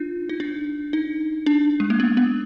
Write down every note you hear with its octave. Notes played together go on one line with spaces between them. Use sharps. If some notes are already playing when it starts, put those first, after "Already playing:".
Already playing: D4 D#4 F4
D#4
D4
D#4
D4
G#3
A#3
B3
B3